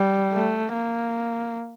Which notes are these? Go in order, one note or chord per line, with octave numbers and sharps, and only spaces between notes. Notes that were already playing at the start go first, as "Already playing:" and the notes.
Already playing: G3
A3
A#3